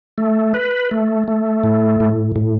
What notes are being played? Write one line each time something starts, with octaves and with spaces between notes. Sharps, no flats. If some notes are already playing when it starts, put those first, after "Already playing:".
A3
B4
A3
A3
A2
A2
A2